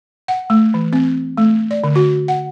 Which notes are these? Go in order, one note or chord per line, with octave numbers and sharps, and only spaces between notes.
F#5
A3
E3
C4
A3
D5
D3
F#4
F#5